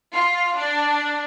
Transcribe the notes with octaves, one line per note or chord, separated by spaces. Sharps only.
F4
D4